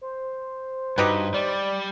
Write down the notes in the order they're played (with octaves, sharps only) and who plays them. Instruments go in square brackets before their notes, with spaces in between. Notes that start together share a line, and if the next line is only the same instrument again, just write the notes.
[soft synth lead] C5
[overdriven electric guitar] G2 [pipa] D#4 G4 B4 [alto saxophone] F#4
[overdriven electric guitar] G3 [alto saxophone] D5